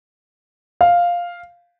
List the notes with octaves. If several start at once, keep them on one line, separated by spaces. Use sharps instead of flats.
F5